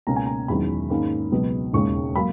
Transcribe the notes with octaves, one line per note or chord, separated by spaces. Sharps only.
C#2 B2 A#3 C#4 A#5
G#5
A#5
E1 E2 D#3 F#3 C#4 B5
G#2 D#3 A#3 C#4
C#2 B2 F#3 B3
E1 D#2 C#3 G#3 C#6
F#3 A#3 B5